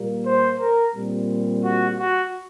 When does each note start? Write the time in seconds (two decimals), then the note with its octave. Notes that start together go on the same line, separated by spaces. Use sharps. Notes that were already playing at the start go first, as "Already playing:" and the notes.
Already playing: A#2 G3 A#3
0.24 C5
0.58 A#4
0.93 A#2 G3 C4
1.63 F#4
1.97 F#4